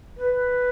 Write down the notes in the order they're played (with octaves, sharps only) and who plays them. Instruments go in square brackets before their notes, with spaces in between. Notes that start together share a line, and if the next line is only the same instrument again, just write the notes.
[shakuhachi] B4